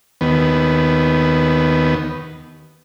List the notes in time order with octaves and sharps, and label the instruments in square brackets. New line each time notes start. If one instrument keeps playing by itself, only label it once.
[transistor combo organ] D#2 B3